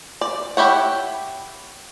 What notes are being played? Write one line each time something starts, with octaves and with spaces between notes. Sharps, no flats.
D5
E4 G4 C#5 F#5